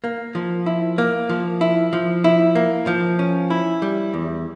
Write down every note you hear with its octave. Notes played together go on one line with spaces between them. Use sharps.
A#3
F3
E4
A#3
F3
E4
F3
E4
A#3
F3
C#4
E4
G3
E2